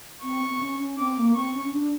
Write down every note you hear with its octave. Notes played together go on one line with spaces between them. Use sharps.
C4 C#6
C4
C#4
C#4
C4 D6
A#3
C4 C#6
C#4
C#4
D4